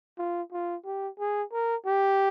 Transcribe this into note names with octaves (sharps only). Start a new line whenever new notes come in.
F4
F4
G4
G#4
A#4
G4